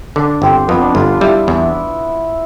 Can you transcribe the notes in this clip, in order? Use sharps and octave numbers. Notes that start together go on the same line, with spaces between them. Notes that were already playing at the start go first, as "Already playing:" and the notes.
D3 D4
G1 C4
F2 B3
D4
G1 F4
F4
G3 E4
E2